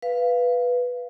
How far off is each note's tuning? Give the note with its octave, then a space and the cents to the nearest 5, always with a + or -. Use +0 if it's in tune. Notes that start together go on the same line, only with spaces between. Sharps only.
B4 +0 F5 -10